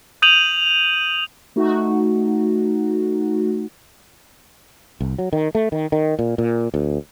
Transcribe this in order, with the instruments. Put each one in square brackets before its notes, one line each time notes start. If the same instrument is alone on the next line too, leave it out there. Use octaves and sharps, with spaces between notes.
[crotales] D#6 G6 D#7 F7 F#7
[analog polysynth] A3 D#4 F#4
[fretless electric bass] C2
F#3
D#3
A3
D#3
D#3
A#2
A#2
D2